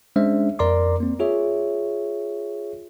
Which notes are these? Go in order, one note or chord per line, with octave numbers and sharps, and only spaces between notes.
G#3 C#4 D4 C5 E5
F2 A#4 D5 A#5 C6 D6
A#3 C4
F4 G#4 C#5 E5